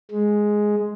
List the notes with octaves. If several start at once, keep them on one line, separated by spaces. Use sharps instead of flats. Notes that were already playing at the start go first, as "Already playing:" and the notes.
G#3